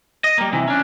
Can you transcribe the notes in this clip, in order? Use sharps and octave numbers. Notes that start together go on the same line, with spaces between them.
D#5
G3 A#3
C3 E3
C#4 D4